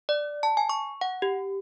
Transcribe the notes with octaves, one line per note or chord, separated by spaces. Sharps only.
D5
A5
G#5
C#6
F#5
G4